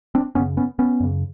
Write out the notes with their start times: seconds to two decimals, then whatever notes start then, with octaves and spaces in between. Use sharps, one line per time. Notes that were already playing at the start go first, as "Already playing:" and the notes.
0.15 C4 D4
0.35 F#2 C#3 B3 C#4
0.57 B3 C#4
0.79 B3 C#4
1.00 F#2 C#3